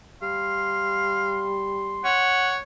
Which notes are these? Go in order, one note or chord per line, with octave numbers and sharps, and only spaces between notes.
G3 F5 C6
C#5 F#5